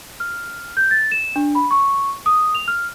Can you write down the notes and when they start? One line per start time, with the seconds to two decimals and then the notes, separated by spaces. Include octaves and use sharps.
0.20 F6
0.77 G6
0.91 A6
1.12 E7
1.36 D4
1.55 B5
1.71 C#6
2.26 D#6
2.55 F7
2.68 F6